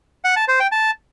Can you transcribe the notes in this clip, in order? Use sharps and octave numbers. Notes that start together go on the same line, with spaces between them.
F#5
A5
C5
G5
A5